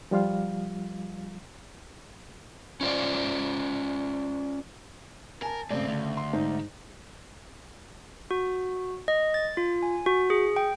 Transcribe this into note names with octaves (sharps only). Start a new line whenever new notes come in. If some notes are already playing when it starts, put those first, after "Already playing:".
F3 G3 F4 F5
C#4 F4 C5 D5
A#4 G#5 A5
G#2 C#3 A3 C4 D5
D2
C6
G#2 D#4 C5
F#4
D#5
A6
F4
G#5
F#4
G#4
G5